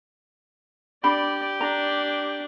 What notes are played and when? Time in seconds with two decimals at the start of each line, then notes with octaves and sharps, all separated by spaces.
1.04 D4 G4 D5 B5
1.61 D4 A#5